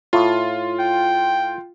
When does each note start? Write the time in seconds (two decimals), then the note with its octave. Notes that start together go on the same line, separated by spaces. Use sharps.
0.13 A2 F4
0.80 G5